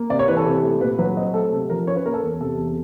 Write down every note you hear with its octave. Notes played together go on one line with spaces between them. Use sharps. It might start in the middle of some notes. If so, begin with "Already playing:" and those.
Already playing: A#3
C3 D5
C#5
E3 B4
A4
C3
A3
A#2 B4
F#3 B4
C4 D#5
A3 A4
C3 A4
F3 A#4
C#4 C#5
B4
A#3 A#4
A4
E2
C3 A4
E2